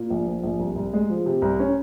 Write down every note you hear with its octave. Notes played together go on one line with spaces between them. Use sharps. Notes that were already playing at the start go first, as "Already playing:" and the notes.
Already playing: A#2
A#1
F3
A#1
C2
C2
G#3
F3
C3
C2
C#4